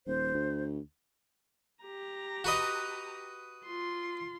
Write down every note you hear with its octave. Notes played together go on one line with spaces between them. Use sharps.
D#1 C5
D2
G4 A#5
F#4 B4 D#5
F4 C6